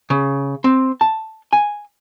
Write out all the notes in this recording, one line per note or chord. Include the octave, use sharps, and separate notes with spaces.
C#3
C4
A5
G#5